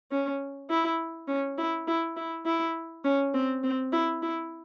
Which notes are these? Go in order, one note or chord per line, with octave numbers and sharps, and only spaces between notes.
C#4
E4
C#4
E4
E4
E4
E4
C#4
C4
C4
E4
E4